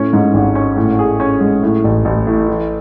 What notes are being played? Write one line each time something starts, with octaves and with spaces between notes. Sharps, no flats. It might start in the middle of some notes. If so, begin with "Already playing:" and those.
Already playing: A2 C#4
G#2
G#1
C#4
A2
G#4
C#4
G#3
A2
A1
A1
A2
E3